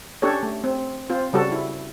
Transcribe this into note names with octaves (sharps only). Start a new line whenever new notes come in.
C#4 D4 G4 A4 C#5
A3
C4
C4 F4 C5
C#3 G3 F#4 A4
E4